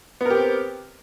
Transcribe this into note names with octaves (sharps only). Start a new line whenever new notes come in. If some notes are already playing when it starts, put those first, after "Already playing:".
B3 C4 G4 A#4